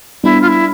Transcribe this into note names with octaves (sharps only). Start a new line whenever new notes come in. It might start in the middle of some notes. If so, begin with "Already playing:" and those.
G3 B3 D4 E4
F4
E4